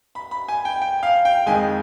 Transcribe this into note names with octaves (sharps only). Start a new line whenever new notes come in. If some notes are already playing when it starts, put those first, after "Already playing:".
B5
B5
G#5
G5
G5
F5
G5
F2 D#3 G#3 G#5